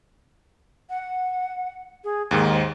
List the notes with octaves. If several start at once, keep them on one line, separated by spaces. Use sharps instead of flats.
F#5
G#4
D#2 G#2 D#3 G#4
C5